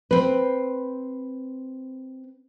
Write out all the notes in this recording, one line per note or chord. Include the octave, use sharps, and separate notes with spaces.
C4 B4